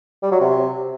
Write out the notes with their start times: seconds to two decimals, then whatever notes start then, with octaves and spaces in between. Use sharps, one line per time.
0.23 G3
0.32 F#3
0.41 C3